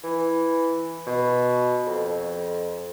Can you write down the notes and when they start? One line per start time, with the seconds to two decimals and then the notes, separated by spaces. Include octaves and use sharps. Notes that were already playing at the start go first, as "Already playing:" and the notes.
0.04 E3
1.07 B2
1.87 F2